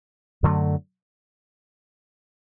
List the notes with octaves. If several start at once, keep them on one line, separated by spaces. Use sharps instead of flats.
F#2 D3 F#3 A3